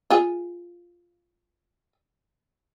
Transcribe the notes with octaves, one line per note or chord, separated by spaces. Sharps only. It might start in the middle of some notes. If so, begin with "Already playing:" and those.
F4 G#4